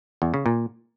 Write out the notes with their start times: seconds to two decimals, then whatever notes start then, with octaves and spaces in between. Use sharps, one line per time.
0.22 E2
0.34 C#3
0.46 A#2